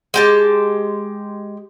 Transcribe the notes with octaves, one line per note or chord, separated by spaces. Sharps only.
G#3 G4 A5